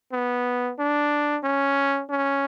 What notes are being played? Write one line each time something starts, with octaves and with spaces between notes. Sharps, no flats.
B3
D4
C#4
C#4